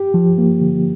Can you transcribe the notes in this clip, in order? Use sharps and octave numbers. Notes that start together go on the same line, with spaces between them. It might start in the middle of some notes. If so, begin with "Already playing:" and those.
Already playing: G4
F3
A#3
D3